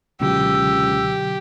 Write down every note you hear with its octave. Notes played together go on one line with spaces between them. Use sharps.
C#2 B2 D3 F#3 G4 E6